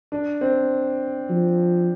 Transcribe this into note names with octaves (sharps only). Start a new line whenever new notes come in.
D4
C4
F3